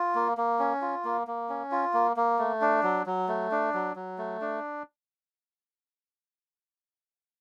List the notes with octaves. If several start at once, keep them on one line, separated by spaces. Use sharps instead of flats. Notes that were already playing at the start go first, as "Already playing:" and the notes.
Already playing: F4
A#3
A#3
C#4
F4
A#3
A#3
C#4
F4
A#3
A#3
A3
D4
F#3
F#3
A3
D4
F#3
F#3
A3
D4